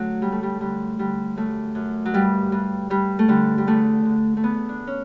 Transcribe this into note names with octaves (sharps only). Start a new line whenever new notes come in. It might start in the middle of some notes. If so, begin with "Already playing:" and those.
Already playing: D3 F#3 A3
F#2 G3
A3
G3
D3 G3
D3 G3
F#2 A3
F#2
F#3
G2 G3
G2
G2 G3
A3
D3 G3
G3
E2 A3
D3
A3
E2 B3
D4
C#4